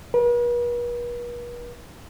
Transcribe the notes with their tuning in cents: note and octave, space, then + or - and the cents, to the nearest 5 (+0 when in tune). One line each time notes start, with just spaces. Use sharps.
B4 -45